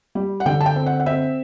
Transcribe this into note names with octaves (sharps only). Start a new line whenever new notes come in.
G3
F#5
D3 G5
A5
G5
C4
F#5
F#5
C4 E5